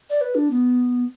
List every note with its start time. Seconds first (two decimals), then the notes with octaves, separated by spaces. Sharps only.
0.10 D5
0.21 B4
0.35 D4
0.51 B3